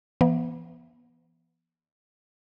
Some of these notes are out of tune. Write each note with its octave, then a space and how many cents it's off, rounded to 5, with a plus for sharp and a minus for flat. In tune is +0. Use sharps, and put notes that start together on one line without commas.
E3 +30 B3 -30